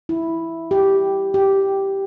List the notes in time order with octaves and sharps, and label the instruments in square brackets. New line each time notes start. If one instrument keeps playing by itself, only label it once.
[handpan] E4
G4
G4